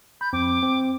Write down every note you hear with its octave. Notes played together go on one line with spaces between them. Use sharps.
B5 G6
F2 C4 D6
C4